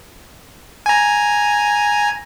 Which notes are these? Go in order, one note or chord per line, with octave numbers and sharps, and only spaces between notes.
G#5 A#5